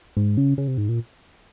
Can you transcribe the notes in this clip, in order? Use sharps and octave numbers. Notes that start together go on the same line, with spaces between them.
G#2
C#3
C#3
C3
G#2
A#2